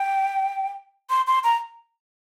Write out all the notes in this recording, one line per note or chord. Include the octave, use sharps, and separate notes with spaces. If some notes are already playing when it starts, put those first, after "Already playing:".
Already playing: G5
C6
C6
A#5